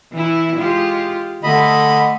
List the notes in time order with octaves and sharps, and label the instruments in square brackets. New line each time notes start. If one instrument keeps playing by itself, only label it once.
[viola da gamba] E3 E4
G#3 F4 G4
[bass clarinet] D3 [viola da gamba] A3 [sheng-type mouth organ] D#5 B5